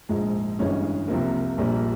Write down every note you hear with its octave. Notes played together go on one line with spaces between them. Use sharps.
A#1 G#2 F3 G#3
G1 G2 E3 G#3 C#4
C2 C3 F3 A#3
A#1 A#2 G3